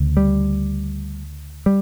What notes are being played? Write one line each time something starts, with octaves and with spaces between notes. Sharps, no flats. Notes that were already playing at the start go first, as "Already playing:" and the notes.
Already playing: D2 C#3
G3
G3